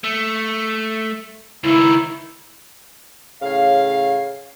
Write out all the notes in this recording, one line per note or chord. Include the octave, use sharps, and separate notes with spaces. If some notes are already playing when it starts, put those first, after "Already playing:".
A3
C#2 D#3 E4
A2 C#3 C#5 F5